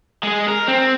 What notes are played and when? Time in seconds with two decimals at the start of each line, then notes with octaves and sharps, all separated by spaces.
0.23 G#3 G#4
0.48 A#4
0.68 C4